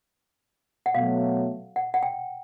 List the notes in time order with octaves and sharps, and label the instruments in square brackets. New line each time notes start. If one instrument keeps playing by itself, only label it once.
[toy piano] F#5
[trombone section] B2 F#3 A3 [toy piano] F5
[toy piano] F#5
F#5
G5